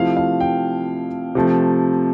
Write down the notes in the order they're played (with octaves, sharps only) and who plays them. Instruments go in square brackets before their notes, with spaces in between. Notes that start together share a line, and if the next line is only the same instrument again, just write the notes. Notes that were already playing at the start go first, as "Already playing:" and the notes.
Already playing: [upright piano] C3 F3 A3 E4 F5
F5
G5
C3 F3 A3